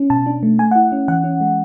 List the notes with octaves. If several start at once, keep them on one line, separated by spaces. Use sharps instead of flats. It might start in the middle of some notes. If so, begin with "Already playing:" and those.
Already playing: C#4
B2 A5
D4
A3
A3 G#5
F#5
E4
C#4
E3 F#5
C#4
G#3